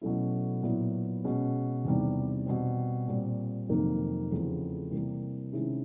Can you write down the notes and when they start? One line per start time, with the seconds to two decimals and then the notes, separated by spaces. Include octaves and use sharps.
0.01 B2 F#3 A3 C#4 E4
0.63 A#2 F#3 B3 E4
1.24 B2 G#3 C#4
1.85 E2 C3 D#3 G3 B3
2.46 B2 G3 C4
3.08 A#2 G3 C4
3.69 F2 C3 D#3 F#3 A#3
4.31 E2 C#3 F3 A3 C4
4.91 C3 E3 G3 A#3
5.53 C3 D#3 G#3 C#4 E4